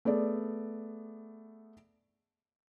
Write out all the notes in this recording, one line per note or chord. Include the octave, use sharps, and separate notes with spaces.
A3 B3 G#4 D5